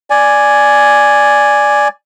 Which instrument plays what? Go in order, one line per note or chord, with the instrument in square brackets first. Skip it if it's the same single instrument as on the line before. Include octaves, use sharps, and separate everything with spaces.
[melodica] D5 G#5